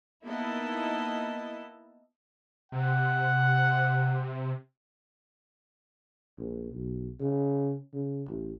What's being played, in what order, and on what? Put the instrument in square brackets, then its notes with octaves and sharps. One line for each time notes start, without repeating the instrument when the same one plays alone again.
[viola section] A#3 B3 D#4 E4 D#5 A5
[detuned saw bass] C3 [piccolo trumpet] F#5
[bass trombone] A#1
B1
C#3
C#3
A1